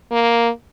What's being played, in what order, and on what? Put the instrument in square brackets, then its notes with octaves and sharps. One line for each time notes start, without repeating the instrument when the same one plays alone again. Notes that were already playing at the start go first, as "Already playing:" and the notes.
[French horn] A#3